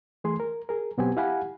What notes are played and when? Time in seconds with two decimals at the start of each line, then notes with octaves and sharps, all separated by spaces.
0.24 E3 A3 G#4 C6
0.40 A#4
0.69 G#4 A#4
0.98 B2 F#3 B3 C4 G4 G#5
1.17 E4 G4 F5 F#5 G#5 B5